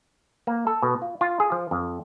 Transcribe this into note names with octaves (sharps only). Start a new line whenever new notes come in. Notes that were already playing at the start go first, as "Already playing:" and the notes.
A#3
A4
B2
F4
F4
G#4
F3
F2